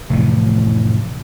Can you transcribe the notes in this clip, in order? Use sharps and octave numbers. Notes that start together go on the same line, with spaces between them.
F1 A2 C3 E3